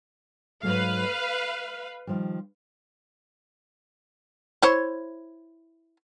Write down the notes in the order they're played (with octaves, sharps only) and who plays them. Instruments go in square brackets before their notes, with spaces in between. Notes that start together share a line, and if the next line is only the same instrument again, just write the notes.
[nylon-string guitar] G#2 F#3 A3 [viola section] B4 F5
[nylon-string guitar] D#5
D#3 F3 G3
[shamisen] E4 C5 C#5